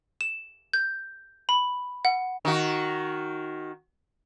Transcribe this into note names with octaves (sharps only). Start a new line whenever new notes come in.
E7
G6
B5
F#5
D#3 F#4